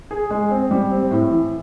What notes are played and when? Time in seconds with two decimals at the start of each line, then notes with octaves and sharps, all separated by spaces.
0.11 G#4
0.31 G#3
0.51 C4
0.71 G3
0.91 C4
1.11 A2
1.31 E3